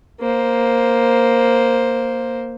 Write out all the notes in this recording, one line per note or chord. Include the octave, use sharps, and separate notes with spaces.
A#3 C5